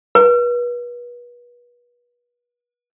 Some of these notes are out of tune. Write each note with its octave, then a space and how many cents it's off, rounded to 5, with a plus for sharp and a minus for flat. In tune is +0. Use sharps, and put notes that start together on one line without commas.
B4 -35